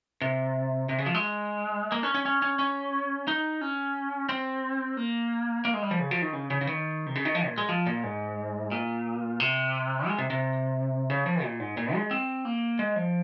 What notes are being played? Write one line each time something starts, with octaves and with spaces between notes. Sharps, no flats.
C3
C3
C#3
F3
G#3
A#3
C#4
C#4
C#4
C#4
C#4
D#4
C#4
C4
A#3
A#3
G#3
G3
F3
C#3
F3
D#3
C#3
C#3
C#3
D#3
C3
C#3
D#3
F3
A#2
G#3
F3
A#2
G#2
A#2
C3
G#3
C3
C3
C#3
F3
A#2
G#2
A#2
G#3
C4
A#3
G#3
F3